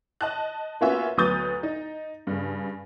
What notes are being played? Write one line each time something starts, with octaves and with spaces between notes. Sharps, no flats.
D#5 A5 F#6
A#3 B3 C#4 F4 F#4 E5
D2 F#3 B3 D#6 G6 A6
D#4
G2 C#3